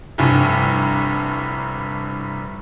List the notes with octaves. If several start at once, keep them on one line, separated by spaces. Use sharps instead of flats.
F1 C2 G2